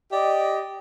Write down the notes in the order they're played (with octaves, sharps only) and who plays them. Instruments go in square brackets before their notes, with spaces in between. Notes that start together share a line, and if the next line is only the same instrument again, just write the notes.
[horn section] G4 D5 D#5